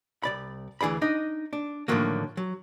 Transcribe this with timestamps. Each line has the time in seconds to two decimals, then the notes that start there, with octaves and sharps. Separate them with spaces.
0.23 C2 D5 B5
0.81 D2 E3 G#4 D5 B5
1.02 D4 D#4 D#5
1.53 D4
1.88 A2 D3 D#3 F3 F#3 A#3
2.37 F#3